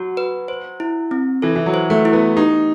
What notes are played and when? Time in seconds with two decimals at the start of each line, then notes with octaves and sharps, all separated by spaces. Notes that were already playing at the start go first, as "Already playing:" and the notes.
Already playing: F#3 F#4
0.17 B4
0.48 C5
0.80 E4
1.11 C4
1.42 E3 A4
1.56 E3
1.66 F#3
1.74 C5
1.90 A3
2.05 E4
2.13 B3
2.37 D#4 G4